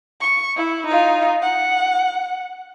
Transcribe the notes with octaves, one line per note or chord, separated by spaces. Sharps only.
C#6
E4
D#4 F4
F#5